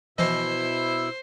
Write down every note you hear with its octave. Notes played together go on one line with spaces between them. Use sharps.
B2 E3 F3 E4 C5 D#5 E6